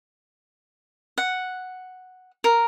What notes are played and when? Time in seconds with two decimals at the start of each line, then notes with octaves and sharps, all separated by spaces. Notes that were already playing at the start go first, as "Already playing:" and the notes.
1.18 F#5
2.44 A#4